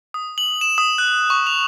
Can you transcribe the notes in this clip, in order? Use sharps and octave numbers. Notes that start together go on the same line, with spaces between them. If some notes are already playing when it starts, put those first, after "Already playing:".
D#6
F#7
E7
D#6
F#6
C#6
F7